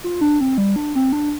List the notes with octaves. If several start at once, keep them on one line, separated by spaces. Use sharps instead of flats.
F4
D4
C4
G3
D4
C4
D4